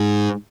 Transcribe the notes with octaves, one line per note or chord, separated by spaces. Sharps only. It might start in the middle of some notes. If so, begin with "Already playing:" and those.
Already playing: G#2